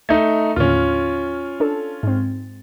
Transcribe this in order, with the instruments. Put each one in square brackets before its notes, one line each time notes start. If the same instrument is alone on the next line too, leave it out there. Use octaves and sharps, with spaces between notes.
[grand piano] A3 D#4 [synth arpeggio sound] G6
[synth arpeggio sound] D#2 A2 D3 [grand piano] C#4 F4
[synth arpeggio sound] D4 A4
G#2 C4